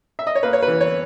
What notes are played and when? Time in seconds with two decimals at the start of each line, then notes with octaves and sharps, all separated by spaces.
0.19 E5
0.27 D#5
0.35 C#5
0.43 A#3 B4
0.53 C#5
0.62 B4
0.68 E3
0.81 C#5